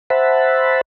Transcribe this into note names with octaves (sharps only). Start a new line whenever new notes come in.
C5 E5 F#5 A5 B5